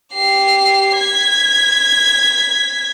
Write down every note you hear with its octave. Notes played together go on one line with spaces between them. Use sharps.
G4 C7
G#6 B6